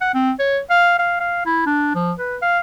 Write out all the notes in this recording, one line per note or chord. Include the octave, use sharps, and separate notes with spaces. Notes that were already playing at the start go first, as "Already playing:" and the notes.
F#5
C4
C#5
F5
F5
F5
E4
D4
F3
B4
F5